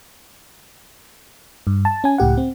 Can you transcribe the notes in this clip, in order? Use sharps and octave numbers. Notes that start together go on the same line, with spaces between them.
G2
A5
C#4 G#5
C#2 A2 G4 F#5
C4